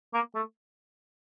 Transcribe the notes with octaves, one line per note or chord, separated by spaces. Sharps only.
A#3
A3